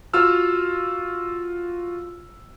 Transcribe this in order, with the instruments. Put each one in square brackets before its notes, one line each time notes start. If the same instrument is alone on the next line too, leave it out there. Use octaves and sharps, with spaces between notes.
[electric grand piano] F4 F#4 E6 F6